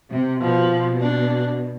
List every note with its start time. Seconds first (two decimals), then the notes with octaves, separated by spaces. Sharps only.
0.10 C3
0.40 B2 F3
0.70 B2
1.00 D4